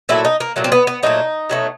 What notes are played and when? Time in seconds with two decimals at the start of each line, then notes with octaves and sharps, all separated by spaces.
0.09 A#2 F#3 A3 E4
0.25 D#4
0.40 A#3
0.56 A#2 F#3 A3
0.64 C4
0.72 B3
0.87 B3
1.03 A#2 F#3 A3 D#4
1.49 B2 F#3 A3